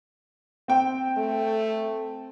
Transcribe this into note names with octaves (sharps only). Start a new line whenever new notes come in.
C4 G5
A3